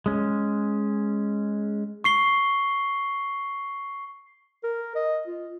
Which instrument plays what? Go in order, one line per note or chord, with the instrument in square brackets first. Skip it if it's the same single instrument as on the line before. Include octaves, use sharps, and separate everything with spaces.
[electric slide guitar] G#3 C#4
[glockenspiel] C#6 C7 G7
[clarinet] A#4
D#5
F4